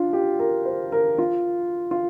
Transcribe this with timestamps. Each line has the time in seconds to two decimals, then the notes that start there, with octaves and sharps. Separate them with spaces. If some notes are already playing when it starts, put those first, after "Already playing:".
Already playing: D4 F4
0.13 G4
0.39 A#4
0.65 C5
0.92 A#4
1.18 F4
1.91 F4